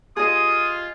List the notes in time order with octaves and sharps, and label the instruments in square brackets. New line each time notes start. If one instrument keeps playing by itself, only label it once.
[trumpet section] F4 [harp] G#4 D#5 [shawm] D#6